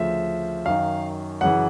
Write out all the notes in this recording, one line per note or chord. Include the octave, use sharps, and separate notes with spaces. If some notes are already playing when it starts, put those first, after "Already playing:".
Already playing: D2 C#3 F3 E5
F#2 D#3 F5
F#2 C#3 E3 F#5